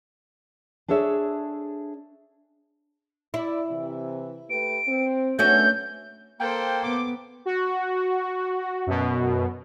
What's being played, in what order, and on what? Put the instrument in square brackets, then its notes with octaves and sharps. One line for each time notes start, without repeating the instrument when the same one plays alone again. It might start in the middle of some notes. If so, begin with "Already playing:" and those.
[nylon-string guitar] D4 G#4 A4 C#5 E5
[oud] E4 [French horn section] D5
[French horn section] C3 E3
[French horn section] A3 G4 B4 [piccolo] D7
[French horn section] C4
[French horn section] F#2 B3 D4 [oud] A3 C#4 F#4 [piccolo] G6
[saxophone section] A#3 [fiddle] A4 C5 [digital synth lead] G5
[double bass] B3 [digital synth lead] D6
[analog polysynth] F#4
F#2 B2